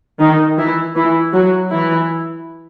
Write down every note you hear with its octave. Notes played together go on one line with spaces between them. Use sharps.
D#3 D#4
E3 E4
E3 E4
F#3 F#4
E3 E4